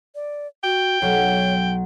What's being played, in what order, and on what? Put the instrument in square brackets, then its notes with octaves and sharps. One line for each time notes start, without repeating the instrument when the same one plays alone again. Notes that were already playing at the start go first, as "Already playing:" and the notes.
[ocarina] D5
[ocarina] F#4 [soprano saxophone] G5
[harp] B1 F#3 [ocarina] C#5